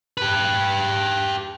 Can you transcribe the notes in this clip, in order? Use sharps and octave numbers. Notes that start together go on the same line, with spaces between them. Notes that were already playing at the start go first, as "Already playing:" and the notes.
G4 B4